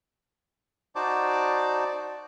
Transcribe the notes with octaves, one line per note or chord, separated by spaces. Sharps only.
D#4 F#4 C5 D5 A5 D6